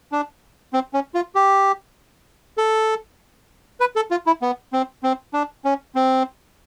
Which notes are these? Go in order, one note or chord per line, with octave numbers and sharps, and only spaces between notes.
D4
C4
C#4
F4
G4
A4
B4
A4
F4
E4
B3
C4
C4
D4
C#4
C4